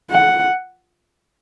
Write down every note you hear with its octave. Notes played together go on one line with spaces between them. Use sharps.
F#5